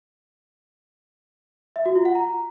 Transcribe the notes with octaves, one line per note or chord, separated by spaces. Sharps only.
E5
F#4
F4
F#5
A#5